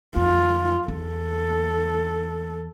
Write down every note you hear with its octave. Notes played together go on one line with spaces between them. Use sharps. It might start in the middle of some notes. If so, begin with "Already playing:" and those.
F2 F4
E2 A4